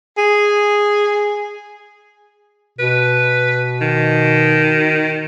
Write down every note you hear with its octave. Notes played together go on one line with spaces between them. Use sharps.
G#4
B2 B4
D#3